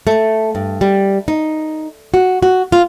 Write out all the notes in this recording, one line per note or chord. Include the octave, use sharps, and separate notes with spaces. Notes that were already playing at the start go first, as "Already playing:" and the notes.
A3
G2
G3
D#4
F#4
F#4
F4